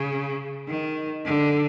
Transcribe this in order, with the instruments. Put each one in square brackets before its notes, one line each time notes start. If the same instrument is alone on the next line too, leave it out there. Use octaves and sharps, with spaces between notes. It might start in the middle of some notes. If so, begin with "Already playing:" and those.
Already playing: [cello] C#3
D#3
D3